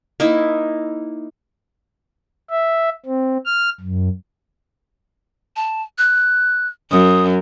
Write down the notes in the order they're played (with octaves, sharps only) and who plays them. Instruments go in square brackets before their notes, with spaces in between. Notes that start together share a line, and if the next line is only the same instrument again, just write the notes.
[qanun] A#3 D#4 E4
[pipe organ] E5
C4
F6
F#2
[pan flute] A5
F#6
[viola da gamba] F#2 [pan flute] D#6